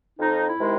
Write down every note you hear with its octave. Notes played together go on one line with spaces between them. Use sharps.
F2 D#4
E4
C3 D#3 G#3